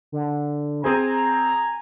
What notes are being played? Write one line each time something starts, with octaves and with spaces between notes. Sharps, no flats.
D3
C4 G#4 C5 G#5 A#5